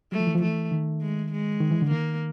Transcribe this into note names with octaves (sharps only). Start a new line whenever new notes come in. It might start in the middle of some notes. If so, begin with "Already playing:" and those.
F#3 A3
F3
E3
F3
E3 A3
D#3
G#3
G#3
D#3
E3
D3
D#3 A#3